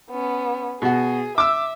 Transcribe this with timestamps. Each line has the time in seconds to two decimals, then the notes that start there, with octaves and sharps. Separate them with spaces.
0.10 B3 C#4
0.82 B2 F#4 G#4
1.38 E5 D6 E6